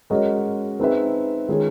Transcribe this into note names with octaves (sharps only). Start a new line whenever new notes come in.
G#3 C#4 F#4 A#4 D#5
C4 D#4 G#4 B4 E5
D#3 G#3 C#4 F4 G#4